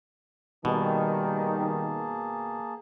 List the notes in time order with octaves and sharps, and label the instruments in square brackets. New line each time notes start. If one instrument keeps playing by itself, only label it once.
[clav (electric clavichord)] B2 [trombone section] D#3 [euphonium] G3 [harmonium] A#3 G#4 A5